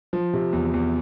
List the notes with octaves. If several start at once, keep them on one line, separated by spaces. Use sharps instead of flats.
F3
C3
E2
E2